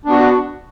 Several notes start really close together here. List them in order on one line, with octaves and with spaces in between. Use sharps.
D4 B3 F#4